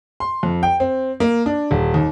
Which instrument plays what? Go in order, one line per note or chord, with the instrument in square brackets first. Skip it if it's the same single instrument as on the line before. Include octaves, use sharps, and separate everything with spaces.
[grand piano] C6
F2
G5
C4
A#3
D4
D#1
D#2